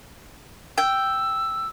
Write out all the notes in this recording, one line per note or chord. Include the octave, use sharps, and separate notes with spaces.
G5 E6